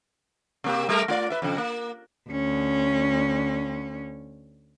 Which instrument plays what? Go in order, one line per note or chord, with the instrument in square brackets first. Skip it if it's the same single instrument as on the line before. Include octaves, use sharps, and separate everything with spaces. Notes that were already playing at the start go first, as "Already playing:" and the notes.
[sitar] C3 A#3 G4
G3 A3 A#4
A3 F4 D5
B4 E5
F2 C#3
A#3
[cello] D2 C#4